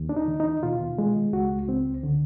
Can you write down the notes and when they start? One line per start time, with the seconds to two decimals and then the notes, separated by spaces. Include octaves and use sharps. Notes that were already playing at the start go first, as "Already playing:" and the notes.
Already playing: D#2
0.09 D4
0.16 D#4
0.28 D#3
0.40 D#4
0.63 B2 F4
0.98 G#3
1.33 C#2 F#4
1.68 C#2 C4
2.03 D3